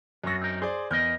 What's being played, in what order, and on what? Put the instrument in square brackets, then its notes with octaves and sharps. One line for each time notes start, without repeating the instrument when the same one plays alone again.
[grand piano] F#2 A#6 [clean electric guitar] B3 C4 F#4
[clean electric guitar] C4 D#4 A#4
[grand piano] G#4 C5 D5 [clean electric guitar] C6
[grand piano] E2 G6 [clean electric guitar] A#4 D#5